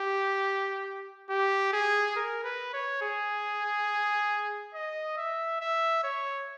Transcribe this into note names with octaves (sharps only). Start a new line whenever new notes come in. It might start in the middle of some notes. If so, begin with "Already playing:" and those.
Already playing: G4
G4
G#4
A#4
B4
C#5
G#4
D#5
E5
E5
C#5